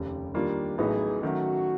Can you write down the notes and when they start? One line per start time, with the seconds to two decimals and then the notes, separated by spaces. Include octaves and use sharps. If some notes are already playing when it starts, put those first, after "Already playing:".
Already playing: F1 D#2 C#3 G4
0.34 D#3 G3 A#3 D4 F4 G4
0.78 A1 A2 F#3 B3 D#4 G#4
1.23 D#3 F#3 A3 C#4 F#4